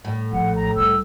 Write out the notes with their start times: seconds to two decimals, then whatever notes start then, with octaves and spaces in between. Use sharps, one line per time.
0.04 A2
0.32 A#1 F#5
0.55 A#5
0.76 C2 E6